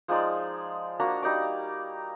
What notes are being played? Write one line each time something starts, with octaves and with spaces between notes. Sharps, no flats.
F3 G#3 D#4 D5
A#3 D4 F#4 A#5
G3 D#4 D5 D6